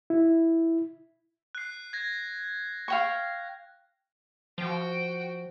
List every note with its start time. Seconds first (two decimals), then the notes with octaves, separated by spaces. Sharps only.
0.10 E4
1.55 F#6 C7
1.93 G#6 A#6
2.88 F5 G5 C#6
4.58 F3 F#4 G5